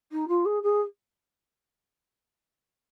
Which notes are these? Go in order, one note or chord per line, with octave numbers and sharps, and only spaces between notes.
D#4
F4
G#4
G#4